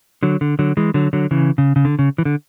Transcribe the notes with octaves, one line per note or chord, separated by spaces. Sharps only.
D3 F#3
D3
D3 F#3
E3 G#3
D3 F#3
D3 F#3
C#3 E3
C#3
C#3
D3
C#3
E3
D3